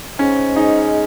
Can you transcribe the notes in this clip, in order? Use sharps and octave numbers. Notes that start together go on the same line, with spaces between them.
G#2 C#4
G#3 D#4